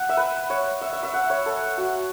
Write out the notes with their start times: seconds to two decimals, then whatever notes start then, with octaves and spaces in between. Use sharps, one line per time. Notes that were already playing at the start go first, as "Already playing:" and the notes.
Already playing: F#5
0.09 E5
0.17 B4
0.50 C#5
0.81 E5
0.93 E5
1.03 E5
1.13 F#5
1.30 C#5
1.46 A4
1.77 F#4